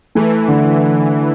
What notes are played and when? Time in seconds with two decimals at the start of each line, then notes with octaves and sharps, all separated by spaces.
0.15 E3 A3
0.48 D3